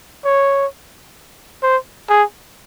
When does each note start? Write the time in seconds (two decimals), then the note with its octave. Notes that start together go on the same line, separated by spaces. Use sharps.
0.25 C#5
1.63 C5
2.09 G#4